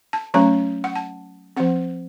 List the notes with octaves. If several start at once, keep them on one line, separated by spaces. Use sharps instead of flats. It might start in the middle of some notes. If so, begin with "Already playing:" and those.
A5
F#3 A3 C#4 A#5
F#5
A5
F3 C4 F#5